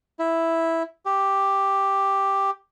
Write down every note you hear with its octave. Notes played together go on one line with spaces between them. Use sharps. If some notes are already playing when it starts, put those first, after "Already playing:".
E4
G4